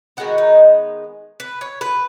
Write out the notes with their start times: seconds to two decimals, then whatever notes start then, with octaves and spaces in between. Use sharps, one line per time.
0.17 D#3 G#3 B3 F#4
0.38 D#4
1.40 B4
1.61 C#5
1.81 B4